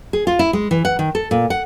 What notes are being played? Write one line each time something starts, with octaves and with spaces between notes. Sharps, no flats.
G#4
F4
E4
G#3
E3
F#5
D#3
A4
A#2
F#5